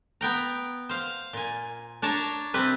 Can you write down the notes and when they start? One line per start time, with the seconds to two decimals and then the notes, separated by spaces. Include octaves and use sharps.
0.21 B3 G5 A#5
0.89 C5 F5
1.33 A#2 G#5
2.02 D4 C#5 A5 A#5
2.54 C3 G3 C4 B4